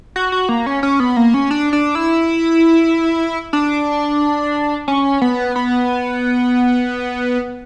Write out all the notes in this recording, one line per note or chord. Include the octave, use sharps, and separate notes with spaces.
F#4
F#4
A#3
C#4
C#4
B3
A#3
C#4
D4
D4
E4
D4
C#4
B3
B3